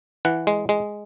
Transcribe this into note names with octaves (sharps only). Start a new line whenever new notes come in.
E3 F#5
G#3
G#3